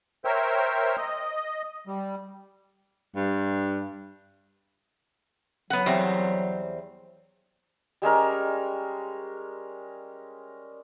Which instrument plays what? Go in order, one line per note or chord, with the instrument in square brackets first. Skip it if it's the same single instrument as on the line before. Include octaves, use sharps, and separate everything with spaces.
[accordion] A#4 C5 C#5 E5 G5
D#5
G3
[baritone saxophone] G2
[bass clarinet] F#3 [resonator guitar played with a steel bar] B3 F#5
[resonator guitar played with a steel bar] E2 G3 C4
[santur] G3 G#3 C#4 A#4